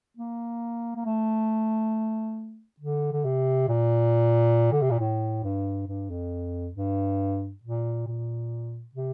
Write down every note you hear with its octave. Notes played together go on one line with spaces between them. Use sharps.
A#3
A#3
A3
D3
D3
C3
A#2
D3
C3
A#2
A2
G2
G2
F2
G2
A#2
A#2
C3